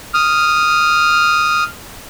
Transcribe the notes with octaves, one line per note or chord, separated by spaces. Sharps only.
D#6 F6